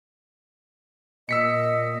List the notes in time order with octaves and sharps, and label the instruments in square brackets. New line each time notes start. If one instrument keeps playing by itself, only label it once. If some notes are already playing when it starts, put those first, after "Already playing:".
[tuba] A#2 [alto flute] D#5 [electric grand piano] E6 B6 C#7